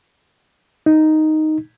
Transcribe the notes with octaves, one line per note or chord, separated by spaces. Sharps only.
D#4